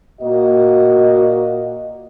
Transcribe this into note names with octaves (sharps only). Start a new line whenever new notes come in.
A#2 A#3 F#4 D#5